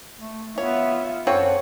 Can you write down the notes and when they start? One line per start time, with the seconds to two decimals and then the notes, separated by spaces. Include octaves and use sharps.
0.19 A3
0.58 B3 F4 C#5 E5
1.27 F#2 C4 F4 A4 C#5 F#5